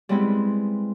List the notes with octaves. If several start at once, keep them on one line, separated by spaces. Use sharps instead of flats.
G3 G#3 B3 C4 E4